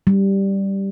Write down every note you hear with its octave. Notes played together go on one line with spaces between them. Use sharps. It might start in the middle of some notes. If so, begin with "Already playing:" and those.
G3